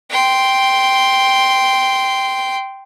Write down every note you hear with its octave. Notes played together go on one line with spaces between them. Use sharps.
G5 C6